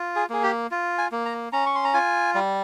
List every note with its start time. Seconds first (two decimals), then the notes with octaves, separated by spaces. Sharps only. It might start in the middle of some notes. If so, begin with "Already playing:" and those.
Already playing: F4
0.16 G#4
0.30 A#3 G#4
0.43 G4
0.71 F4
0.98 G#5
1.12 A#3
1.25 A#5
1.53 C#4 A#5
1.66 C#6
1.75 C6
1.84 A#5
1.94 F4 G#5
2.35 G3